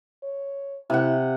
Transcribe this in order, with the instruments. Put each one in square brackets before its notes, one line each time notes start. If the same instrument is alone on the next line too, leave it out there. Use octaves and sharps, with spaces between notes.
[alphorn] C#5
[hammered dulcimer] C3 F#5 [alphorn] E4